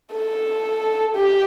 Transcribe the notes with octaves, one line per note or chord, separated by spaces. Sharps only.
A4
G4